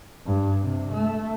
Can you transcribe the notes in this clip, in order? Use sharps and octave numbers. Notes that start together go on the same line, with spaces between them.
G2
C3
A3